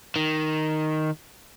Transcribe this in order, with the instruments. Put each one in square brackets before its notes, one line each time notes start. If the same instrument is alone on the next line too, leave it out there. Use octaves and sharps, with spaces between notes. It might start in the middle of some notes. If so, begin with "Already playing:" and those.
[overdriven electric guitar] D#3